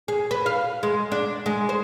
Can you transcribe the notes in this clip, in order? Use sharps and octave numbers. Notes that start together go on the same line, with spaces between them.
G#4
B4
F5
G#3
D4
G#3
C5